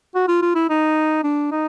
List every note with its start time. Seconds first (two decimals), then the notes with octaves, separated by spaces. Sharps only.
0.15 F#4
0.28 F4
0.42 F4
0.55 E4
0.70 D#4
1.24 D4
1.52 D#4